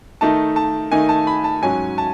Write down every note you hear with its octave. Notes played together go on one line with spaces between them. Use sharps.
D#3 A3 D#4 A5
A5
D#3 A3 D#4 G#5
A5
B5
A5
G#2 F#3 C#4 G#5
A5